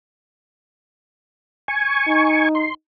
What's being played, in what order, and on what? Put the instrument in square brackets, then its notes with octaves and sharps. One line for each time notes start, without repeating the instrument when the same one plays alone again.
[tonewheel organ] G#5 C#6
[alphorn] D#4
[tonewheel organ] C6